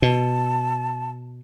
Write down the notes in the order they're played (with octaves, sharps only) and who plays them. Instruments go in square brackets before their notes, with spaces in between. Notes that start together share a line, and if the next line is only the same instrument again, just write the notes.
[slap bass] B2 [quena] A5